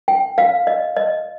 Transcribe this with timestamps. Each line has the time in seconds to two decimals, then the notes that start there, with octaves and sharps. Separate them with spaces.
0.08 G5
0.38 F5
0.67 D#5
0.96 D#5